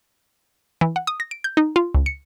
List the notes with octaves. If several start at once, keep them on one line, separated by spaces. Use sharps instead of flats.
E3
F#5
D#6
A#6
D7
G6
D#4
F4
C#2
C#7